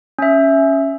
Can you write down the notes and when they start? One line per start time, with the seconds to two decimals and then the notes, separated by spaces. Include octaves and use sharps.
0.19 C#4 E5